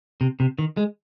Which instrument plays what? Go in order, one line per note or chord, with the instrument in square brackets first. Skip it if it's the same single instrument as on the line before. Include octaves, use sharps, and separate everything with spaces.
[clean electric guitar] C3
C3
D#3
G#3